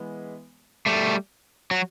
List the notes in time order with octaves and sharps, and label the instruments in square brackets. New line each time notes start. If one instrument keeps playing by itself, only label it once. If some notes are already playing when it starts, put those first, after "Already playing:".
Already playing: [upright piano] E3 G#3 B3
[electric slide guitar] G3 A3
F#3